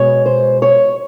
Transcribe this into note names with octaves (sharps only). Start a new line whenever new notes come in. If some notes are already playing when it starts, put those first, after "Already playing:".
Already playing: B2 G#3 C#5
C5
C#5